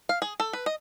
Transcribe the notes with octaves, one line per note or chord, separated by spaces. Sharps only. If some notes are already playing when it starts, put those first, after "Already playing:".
F5
G#4
A4
B4
D#5